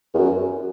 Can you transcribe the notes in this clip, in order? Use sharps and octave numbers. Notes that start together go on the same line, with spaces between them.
E2
F#2